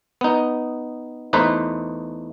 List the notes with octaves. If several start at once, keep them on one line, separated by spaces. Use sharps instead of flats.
B3 D#4
E2 A3 D#4 B4 C5